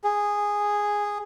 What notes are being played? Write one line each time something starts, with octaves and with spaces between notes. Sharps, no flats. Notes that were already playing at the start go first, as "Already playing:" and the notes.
G#4